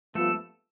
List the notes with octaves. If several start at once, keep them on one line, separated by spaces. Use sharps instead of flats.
G2 F3 A3 B3 F4 A4